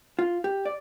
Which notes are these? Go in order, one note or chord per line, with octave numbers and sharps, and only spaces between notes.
F4
G4
D5